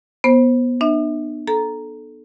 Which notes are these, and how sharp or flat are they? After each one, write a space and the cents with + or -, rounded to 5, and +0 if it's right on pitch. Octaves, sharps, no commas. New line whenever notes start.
B3 -15 C5 +15
D4 +45 E5 -30
A4 -10 A#5 +0